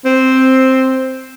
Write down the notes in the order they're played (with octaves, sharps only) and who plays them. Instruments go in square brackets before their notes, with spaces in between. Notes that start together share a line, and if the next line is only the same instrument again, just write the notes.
[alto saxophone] C4